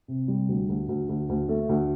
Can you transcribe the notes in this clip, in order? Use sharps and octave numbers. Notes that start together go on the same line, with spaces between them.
C3
G3
D2
D2
D2
D2
D2
A3
D2